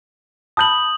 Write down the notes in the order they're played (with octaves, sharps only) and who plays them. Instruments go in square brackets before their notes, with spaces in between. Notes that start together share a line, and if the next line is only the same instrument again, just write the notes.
[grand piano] A5 B5 G6 [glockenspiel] D#6 F#7